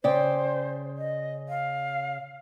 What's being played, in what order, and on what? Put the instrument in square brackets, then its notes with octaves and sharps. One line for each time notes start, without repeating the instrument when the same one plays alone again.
[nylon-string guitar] C#3 D5 G5 [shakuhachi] C5
[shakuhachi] D#5
F5